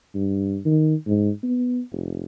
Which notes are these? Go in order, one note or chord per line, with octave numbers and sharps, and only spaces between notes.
G2
D#3
G#2
B3
F1